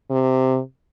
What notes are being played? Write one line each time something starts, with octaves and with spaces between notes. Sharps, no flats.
C3